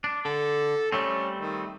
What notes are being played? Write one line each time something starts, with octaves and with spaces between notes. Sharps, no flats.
D4
D3 A4
G3 A3 C4 C#4
D#3